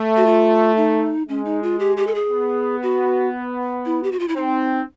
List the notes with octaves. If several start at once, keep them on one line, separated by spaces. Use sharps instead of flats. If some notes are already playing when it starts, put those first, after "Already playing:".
Already playing: A3
F#4
F4
D#4
G#3 C#4
D#4
F4
G4
G4
A4
G#4
B3
F#4
E4
G4
F#4
F4
E4
C4 D#4